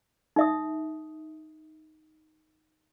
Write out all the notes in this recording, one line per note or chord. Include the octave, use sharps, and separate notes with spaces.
D#4 E5 D#6